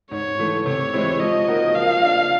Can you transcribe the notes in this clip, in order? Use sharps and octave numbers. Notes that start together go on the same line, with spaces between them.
G#2 C#5
E3 A3
C3 C#5
E3 G#3 C4 E4
F3 D#5
A#3 D#4 F#4 A#4
F3 F5
A#3 D4